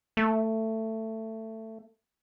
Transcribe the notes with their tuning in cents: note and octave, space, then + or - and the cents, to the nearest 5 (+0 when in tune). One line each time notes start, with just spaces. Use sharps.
A3 +15